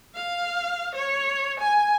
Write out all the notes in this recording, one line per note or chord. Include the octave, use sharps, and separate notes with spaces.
F5
C#5
G#5